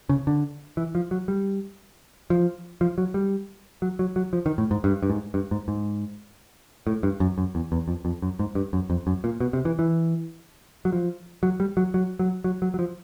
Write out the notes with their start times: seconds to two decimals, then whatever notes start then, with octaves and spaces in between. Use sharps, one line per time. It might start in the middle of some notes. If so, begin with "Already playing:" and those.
0.09 C#3
0.27 D3
0.77 E3
0.95 F3
1.11 F#3
1.28 G3
2.30 F3
2.81 F3
2.98 F#3
3.14 G3
3.82 F#3
3.99 F#3
4.16 F#3
4.33 F3
4.46 D#3
4.58 A2
4.71 G#2
4.84 G2
5.03 G2
5.10 G#2
5.34 G2
5.51 G#2
5.68 G#2
6.87 A2
7.03 G2
7.20 F#2
7.38 F#2
7.55 E2
7.72 E2
7.88 F2
8.05 F2
8.22 F#2
8.39 G#2
8.55 G2
8.73 F#2
8.90 F2
9.07 F#2
9.24 A#2
9.40 B2
9.53 C3
9.65 E3
9.79 E3
10.85 F#3
10.92 F3
11.43 F#3
11.60 G3
11.77 F#3
11.94 F#3
12.19 F#3
12.44 F#3
12.62 F#3
12.74 F#3
12.79 F3